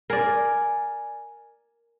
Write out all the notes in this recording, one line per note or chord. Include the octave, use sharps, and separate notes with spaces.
A#4 D5 G#5